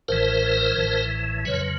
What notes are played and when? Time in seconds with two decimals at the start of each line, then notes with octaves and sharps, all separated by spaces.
0.08 A1 A2 E3 A#4 C5
0.77 A1 A2 E3
1.45 F2 C#3 F#3 B4 C#5